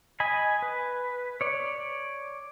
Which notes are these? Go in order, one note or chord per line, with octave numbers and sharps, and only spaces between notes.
D#5 G#5 B5
B4
C#5 D5